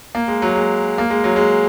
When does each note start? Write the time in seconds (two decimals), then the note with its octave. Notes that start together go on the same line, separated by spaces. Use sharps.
0.15 A#3
0.28 G#3
0.42 F#3
0.56 G#3
0.98 A#3
1.10 G#3
1.24 F#3
1.36 G#3